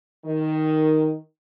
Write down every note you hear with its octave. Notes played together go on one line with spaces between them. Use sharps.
D#3